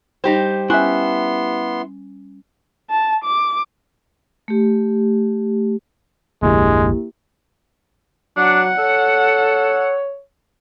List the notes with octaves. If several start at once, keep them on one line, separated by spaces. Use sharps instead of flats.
G3 D#4 G4 C5
B3 C#4 E4 E5 G#5 C6 F#6
A5
D6
A3 G4
F1 A#1 D3 G#3 A#3 E4 G4
F#3 D4 F#5
A4 C#5